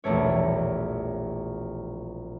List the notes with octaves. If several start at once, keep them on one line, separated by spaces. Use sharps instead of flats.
E1 A#1 G3 A3 C#5